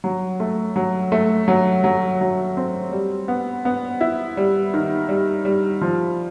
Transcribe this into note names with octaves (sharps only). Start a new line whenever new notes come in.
F#3
A3
F#3
A3
F#3
F#3
F#3
C4
G3
B3
B3
E4
G3
D#3
G3
G3
F3